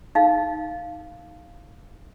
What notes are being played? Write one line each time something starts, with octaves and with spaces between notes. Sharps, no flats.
D#4 F5